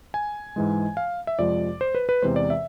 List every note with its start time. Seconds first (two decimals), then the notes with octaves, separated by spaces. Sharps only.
0.14 G#5
0.56 G#2 E3 G#3
0.97 F5
1.27 E5
1.39 F2 C3 F3 G#3 D5
1.81 C5
1.95 B4
2.09 B4
2.22 E2 C3 E3 G#3 C5
2.36 D5
2.50 E5